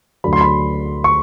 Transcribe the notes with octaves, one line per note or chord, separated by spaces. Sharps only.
D2 D3 F#3 B5
C6
B5
C#6